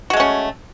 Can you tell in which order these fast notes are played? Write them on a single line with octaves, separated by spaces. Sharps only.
F#4 G#3 A3 C#4